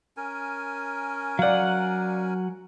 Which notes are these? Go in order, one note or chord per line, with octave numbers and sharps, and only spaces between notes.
C#4 A#4 G#5
F#3 D5 F5 F#5